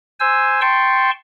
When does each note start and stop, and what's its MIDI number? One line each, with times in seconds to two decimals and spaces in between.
0.20 0.60 72
0.20 0.60 80
0.20 0.60 88
0.61 1.11 79
0.61 1.11 81
0.61 1.11 84
0.61 1.11 85